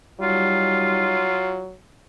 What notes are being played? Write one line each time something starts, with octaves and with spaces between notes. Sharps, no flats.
F#3 G3 D#4 F4